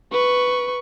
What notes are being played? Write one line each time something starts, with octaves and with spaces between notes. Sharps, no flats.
B4 C#6